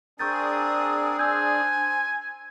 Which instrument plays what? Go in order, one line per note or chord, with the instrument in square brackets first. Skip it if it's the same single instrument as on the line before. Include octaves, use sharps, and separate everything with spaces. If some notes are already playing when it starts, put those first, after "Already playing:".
[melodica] C4 A#4 D#6 [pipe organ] D4 G#4 [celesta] C#6 G6 A6
[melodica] C5 [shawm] G#5 [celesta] E6 G6